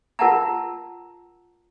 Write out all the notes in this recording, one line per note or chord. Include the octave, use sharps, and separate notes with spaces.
F4 A#4 F#5 A5 A#5